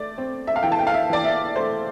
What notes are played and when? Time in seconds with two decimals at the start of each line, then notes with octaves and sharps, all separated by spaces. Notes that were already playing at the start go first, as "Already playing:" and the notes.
Already playing: A3 D5
0.18 C4
0.47 E5
0.56 F5
0.63 E3 G5
0.72 A5
0.79 G5
0.87 F5
0.94 E5
1.09 E3 D5
1.25 E5
1.56 A3 C5